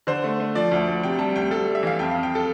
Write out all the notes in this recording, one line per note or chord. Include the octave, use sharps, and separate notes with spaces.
D3 C5
A3
A3
F3 D5
D2
D2
C3 G5
G3 A5
D2 G5
G3 A4
G3
E5
E3 F5
F2 G5
F5
F2
G5
A4